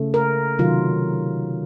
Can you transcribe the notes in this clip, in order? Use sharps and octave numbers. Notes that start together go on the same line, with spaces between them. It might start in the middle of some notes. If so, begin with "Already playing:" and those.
Already playing: C#3 A3
A#4
C3 D#3 F#3 F4